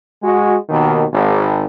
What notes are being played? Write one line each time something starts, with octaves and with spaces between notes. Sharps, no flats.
G#3 F#4
D#2 B2 D#3
G#1